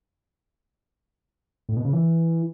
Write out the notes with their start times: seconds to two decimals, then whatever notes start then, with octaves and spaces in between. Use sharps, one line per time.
1.69 A2
1.77 B2
1.85 C#3
1.93 E3